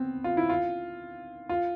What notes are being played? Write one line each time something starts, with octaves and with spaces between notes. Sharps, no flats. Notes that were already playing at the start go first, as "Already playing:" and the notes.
Already playing: B3 C4
F4
E4
F4
F4